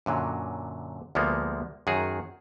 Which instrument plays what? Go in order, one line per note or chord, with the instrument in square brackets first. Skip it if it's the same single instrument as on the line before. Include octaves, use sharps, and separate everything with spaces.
[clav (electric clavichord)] F#2 A#2 D3 F#3
D2 F3 G3 G#3 A#3 B3
F#2 D#3 F#4 G#4